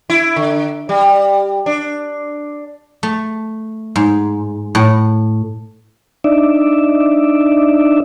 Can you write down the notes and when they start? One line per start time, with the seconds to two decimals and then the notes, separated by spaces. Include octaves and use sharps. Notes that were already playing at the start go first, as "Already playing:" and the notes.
0.10 E4
0.36 D3
0.89 G3
1.66 D4
3.03 A3
3.96 G#2
4.75 A2
6.24 D4 D#4 D5 E5